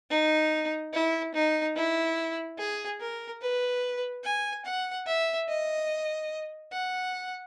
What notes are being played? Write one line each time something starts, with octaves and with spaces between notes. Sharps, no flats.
D#4
E4
D#4
E4
G#4
A#4
B4
G#5
F#5
E5
D#5
F#5